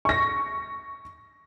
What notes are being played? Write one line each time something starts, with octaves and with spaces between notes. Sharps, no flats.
C#6 A#6